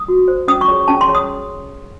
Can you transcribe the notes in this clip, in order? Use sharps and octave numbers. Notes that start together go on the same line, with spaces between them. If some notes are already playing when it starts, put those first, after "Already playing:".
Already playing: D#6
F#4
C5
C#4 D#6
C#6
G#4 C#5
C#4 A5
C6
G#4 C#5
D#6